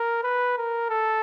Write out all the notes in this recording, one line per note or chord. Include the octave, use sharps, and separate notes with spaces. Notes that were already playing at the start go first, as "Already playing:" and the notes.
Already playing: A#4
B4
A#4
A4